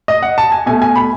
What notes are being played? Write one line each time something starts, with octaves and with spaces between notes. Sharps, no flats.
D#5
F#5
A5
G#5
B2 A3 G#5
G#5
B5